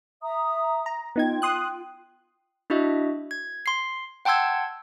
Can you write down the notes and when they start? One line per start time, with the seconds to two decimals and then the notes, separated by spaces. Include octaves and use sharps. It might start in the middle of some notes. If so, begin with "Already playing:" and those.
0.24 E5 A#5 D#6
0.86 A#5
1.16 B3 D#4 F4 G5 G#6
1.42 C6 D#6 F#6
2.70 D4 E4 F#4 D#5 E5
3.31 G#6
3.66 C6 C7
4.25 F#5 G5 A5 C6 E6 G#6